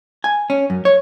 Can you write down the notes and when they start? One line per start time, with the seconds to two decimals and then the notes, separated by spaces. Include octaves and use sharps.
0.24 G#5
0.50 C#4
0.70 F#2
0.85 C#5